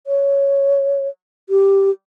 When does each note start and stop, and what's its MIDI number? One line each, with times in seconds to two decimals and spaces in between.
0.07 1.08 73
1.49 1.90 67